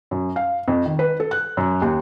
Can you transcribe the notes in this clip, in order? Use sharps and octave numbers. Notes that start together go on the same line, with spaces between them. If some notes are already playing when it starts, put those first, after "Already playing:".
F#2
F5
F2
D#3
B4
A4
F#6
F#2
D#2